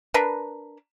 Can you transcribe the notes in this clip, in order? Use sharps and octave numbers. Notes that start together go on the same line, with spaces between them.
D4 A#4 B4